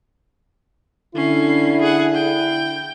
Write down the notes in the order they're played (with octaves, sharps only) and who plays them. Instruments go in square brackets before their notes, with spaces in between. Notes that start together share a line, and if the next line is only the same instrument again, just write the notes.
[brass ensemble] D3 E4 [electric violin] C#4 C7
[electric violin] G#4 F#5
G5